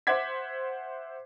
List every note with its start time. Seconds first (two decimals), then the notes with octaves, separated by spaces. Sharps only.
0.07 C5 E5 F#5 D6 G#6 B6